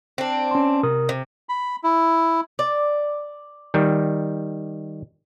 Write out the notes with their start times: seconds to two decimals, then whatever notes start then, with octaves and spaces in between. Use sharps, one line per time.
0.18 C4 D4
0.51 C#4 C6
0.83 C3 A#4 D#6
1.09 C3
1.49 B5
1.84 E4
2.59 D5
3.74 D#3 G3